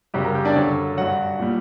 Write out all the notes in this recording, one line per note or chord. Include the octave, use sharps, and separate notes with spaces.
F#2 C#3 G3 G4 G5
A#4 A#5
G4 G5
D4 D5
F#2 D3 F#3 C#4 C#5
G2 F#3 F#4 F#5
A#2 G3